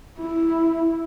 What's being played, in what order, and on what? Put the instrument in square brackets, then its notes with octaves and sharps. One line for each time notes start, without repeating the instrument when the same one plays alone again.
[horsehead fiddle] E4